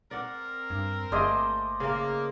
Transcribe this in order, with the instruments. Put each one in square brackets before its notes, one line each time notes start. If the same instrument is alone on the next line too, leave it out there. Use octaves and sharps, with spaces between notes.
[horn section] C4 A#4 [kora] D5 F#5
[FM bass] G2
[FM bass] G1 [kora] A3 A#3 G#4 [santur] C5 D5 D#5
[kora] C#3 [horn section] A#3